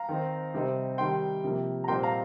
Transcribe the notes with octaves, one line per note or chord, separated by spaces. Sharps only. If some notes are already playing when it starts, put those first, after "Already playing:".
Already playing: F5 A#5
D#3 C4 D#4
C3 G3 C4 D#4
D#3 G3 D#4 G5 C6
C3 F3 A#3
A#5
A#2 G3 C4 D#4 G5 C6
F5 A#5